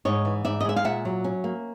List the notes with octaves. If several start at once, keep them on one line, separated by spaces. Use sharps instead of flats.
G#2 C#5 D#5
E3
G#2 D5 E5
D#5
G#3 E5
F5
A#2 E5 F#5
F#3
C#4
A#3